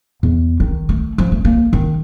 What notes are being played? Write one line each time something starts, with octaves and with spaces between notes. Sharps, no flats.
E2
D#3
A3
F3
A3
A#3
D#3